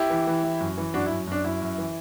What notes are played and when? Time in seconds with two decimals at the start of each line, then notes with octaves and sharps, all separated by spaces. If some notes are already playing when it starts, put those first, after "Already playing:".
Already playing: E4 G4
0.10 E3
0.27 E3
0.43 E3
0.60 F#2
0.78 E3
0.94 F#2 D4 F#4
1.06 E4
1.11 F#2
1.27 F#2 D4
1.44 F#2 E4
1.61 F#2
1.78 E3